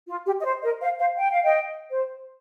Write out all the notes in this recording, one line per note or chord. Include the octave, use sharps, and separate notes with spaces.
F4
G4
D#5
C5
A#4 D#5
C5 F5
C5 F5
G5
F5
D#5 G5
C5